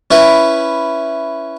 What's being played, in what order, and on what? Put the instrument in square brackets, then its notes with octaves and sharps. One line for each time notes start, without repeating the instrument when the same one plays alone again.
[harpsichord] C#4 E4 B4